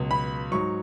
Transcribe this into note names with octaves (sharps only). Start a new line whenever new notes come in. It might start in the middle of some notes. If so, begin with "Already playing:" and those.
Already playing: C#2 B2 F#3
B5
G#2 F#3 C#6